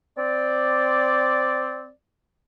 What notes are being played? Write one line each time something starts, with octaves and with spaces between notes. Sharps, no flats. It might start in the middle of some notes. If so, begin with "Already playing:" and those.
C4 D5